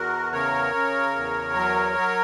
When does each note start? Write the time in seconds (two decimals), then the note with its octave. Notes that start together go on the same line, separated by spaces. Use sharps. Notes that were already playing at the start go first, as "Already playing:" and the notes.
Already playing: E2 F#4 A#4
0.32 C#3 A#4 C#5
0.74 C#3
1.15 E2
1.56 F#3
1.97 F#3